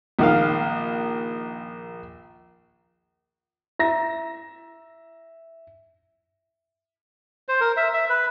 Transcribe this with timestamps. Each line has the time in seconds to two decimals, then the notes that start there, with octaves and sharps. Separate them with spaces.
0.19 A#1 D#3 F5
3.79 E4 E5 A#6
7.48 C5
7.61 A#4
7.77 E5
7.94 E5
8.09 B4